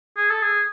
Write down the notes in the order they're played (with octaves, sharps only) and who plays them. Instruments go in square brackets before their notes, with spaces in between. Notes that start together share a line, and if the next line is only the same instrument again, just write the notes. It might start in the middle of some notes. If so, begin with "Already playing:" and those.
[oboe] G#4
A4
G#4